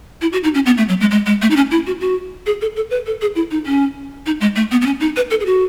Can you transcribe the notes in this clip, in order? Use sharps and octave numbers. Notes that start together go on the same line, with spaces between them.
E4
F#4
D#4
C#4
B3
A3
F#3
G#3
G#3
G#3
A3
D#4
C#4
E4
F#4
F#4
G#4
A4
A4
B4
A4
G#4
E4
D#4
C#4
D#4
G#3
A3
B3
B3
C#4
D#4
B4
A4
G#4
F#4